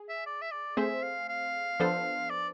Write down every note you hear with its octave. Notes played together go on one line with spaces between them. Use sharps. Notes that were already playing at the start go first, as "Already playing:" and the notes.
Already playing: G#4
E5
D5
E5
D5
A3 C4 G#4 C5 E5
F5
F5
F3 B3 D4 A4 C5
D5